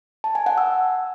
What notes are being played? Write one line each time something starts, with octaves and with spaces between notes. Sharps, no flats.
A5
G#5
F#5
E6